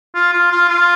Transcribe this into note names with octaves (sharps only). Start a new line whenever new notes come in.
F4
F4
F4
F4